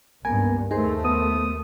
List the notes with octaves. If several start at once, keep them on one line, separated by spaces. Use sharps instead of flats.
C#2 G2 A#3 B3 A#4 G#5
D#2 A3 D#4 G#4 A#4 C5 C6
B3 D#6